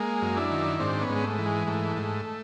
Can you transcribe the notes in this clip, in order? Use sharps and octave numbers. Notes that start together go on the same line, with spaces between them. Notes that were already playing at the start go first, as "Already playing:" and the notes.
Already playing: G#3 A#3
F#2
D4 E4
D#3
G#2 C4 D4
B3 C#4
G#2
G#3
A3
E3
G#3
G#2 A3
G#2